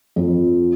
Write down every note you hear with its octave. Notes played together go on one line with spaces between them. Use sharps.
F2